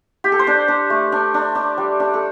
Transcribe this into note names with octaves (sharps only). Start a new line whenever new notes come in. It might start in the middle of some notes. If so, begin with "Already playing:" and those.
G4
A4
C5
D4 D5
D4
A3
D4
D4
D4
G3
D4
A4